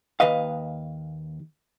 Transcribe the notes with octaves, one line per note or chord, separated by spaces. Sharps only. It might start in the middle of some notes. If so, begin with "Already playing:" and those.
D#2 B4 D#5 F5